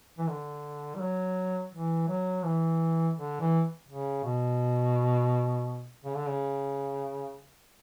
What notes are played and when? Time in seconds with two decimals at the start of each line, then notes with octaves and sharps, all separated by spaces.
0.19 E3
0.29 D3
0.95 G3
1.01 F#3
1.72 E3
2.09 F#3
2.44 E3
3.17 D3
3.41 E3
3.88 C#3
4.24 B2
6.04 C#3
6.16 D3
6.29 C#3